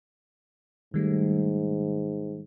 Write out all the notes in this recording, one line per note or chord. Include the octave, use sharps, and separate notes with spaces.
G#2 D#3 G3 A3